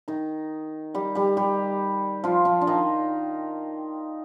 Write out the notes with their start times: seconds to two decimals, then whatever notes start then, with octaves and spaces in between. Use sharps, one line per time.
0.08 D#3 D#4
0.94 G3 G4
1.15 G3 G4
1.37 G3 G4
2.24 F3 F4
2.45 F3 F4
2.61 D4
2.67 D#3 D#4